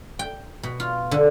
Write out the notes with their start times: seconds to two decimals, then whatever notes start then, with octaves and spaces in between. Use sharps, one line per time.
0.19 G5
0.63 B2
0.80 F4
1.11 D3